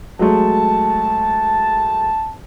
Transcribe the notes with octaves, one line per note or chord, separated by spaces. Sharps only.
F#3 G#3 A3 A5